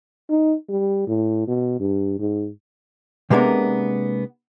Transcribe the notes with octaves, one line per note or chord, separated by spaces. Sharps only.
D#4
G3
A2
B2
G2
G#2
C3 G#3 A#3 B3 D4 A#4